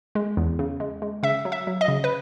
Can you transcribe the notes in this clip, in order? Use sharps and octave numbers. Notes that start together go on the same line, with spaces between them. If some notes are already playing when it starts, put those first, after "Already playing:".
G#3
E2
C#3
G#3
G#3
C#3 E5
F#3
E5
F#3
D#5
C#3
B4